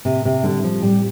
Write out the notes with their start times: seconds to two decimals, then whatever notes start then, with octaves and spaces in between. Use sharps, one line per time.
0.05 A2 C3
0.25 C3
0.44 D3 G3 C4 G4
0.64 F3
0.82 A2 G3